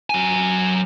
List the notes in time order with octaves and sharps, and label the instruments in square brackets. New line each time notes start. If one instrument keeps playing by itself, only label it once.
[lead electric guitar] F#3 G#5